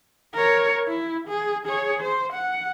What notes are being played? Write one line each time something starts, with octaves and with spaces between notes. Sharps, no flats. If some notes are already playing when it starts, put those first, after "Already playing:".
A#4 C#5
E4
G#4
G#4 C#5
C5
F#5